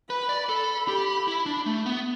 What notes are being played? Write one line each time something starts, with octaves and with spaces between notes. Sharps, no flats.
B4 B5
D5
A4 B5
G4
E4
D4
A3
B3